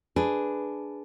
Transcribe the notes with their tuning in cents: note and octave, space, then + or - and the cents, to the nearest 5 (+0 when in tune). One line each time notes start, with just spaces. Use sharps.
D4 +0 G#4 +5 B4 +0